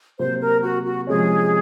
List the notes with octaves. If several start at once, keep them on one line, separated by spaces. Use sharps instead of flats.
C3 F#3 A#3 C5
A#4
F#4
F#4
C3 F3 G#3 C#4 G#4